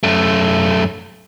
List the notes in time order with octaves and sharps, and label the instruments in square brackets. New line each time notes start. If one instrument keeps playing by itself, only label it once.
[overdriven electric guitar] F#2 A3